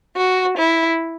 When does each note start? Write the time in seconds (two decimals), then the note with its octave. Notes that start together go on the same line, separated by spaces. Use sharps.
0.17 F#4
0.57 E4